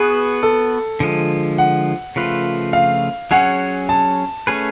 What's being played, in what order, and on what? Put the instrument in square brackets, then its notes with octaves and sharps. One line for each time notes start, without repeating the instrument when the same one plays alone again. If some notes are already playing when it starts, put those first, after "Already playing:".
Already playing: [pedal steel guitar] B3 F#4 B4 [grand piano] G#4
[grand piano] A4
[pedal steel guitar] D3 F3 G#3
[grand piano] F#5
[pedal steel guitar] C#3 F3 A3 F4 B4
[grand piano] F5
[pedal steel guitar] F#3 C#4 G#4 C#5 [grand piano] F#5
[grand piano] A5
[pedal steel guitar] A3 C#4 G#4 B4